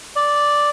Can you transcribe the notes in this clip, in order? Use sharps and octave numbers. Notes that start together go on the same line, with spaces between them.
D5